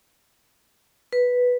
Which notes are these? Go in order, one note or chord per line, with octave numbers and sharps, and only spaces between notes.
B4